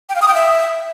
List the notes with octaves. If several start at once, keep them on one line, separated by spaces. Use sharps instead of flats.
G5
F5
D#6
G5
E5